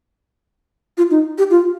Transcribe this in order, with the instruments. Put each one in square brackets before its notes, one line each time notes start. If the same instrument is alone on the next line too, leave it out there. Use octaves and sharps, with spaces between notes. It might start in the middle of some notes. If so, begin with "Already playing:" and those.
[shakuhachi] F4
D#4
G4
F4